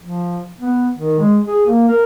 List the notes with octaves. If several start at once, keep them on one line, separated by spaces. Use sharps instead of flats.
F3
B3
D#3
G#3
G#4
A#3
A#4